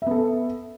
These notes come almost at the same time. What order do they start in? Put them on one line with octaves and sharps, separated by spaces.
E5 B3 A4